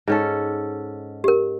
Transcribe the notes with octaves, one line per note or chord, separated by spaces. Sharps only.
G#2 C#4 A4
G4 A#4